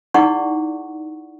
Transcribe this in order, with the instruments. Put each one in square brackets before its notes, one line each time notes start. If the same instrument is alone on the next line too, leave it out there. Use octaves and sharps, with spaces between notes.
[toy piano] D#4 E4 G#4 D5 F#5 C#6